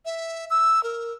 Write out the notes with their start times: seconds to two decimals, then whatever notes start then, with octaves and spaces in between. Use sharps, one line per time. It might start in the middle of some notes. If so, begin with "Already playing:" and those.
0.05 E5
0.50 E6
0.83 A#4